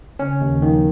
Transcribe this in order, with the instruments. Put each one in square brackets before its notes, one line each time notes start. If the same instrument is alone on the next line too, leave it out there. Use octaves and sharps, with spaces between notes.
[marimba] C#3 [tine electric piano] C#4
[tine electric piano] D#2 [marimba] D#3
[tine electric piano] D#3 [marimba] F3